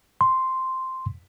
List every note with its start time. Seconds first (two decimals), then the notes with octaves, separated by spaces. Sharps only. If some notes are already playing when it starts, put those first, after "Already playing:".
0.21 C6